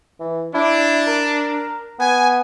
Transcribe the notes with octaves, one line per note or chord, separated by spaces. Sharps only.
E3
D4 E4
A#4
B3 G#5